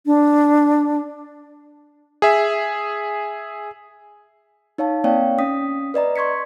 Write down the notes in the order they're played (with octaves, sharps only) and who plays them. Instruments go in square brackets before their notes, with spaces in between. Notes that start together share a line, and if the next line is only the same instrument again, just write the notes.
[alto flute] D4
[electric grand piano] G#4 E5
[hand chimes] D#4 C#5 F5 A5
A#3 C4 C#5 D5 F5 G5
C#4 D#6 B6
B4 D5 D#5 A#5
C6 C#6 G#6 B6 C#7